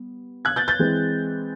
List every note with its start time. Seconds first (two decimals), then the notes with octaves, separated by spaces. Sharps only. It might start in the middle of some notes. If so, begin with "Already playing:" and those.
Already playing: G3 B3
0.45 F#6 G#6
0.56 G6 A6
0.68 G6 A6
0.79 E3 G#3 C4